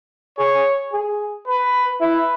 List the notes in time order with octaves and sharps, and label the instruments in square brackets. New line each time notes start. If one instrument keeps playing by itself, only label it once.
[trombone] G#4 [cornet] C#5
[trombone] G#4
[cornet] B4
[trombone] E4 [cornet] B4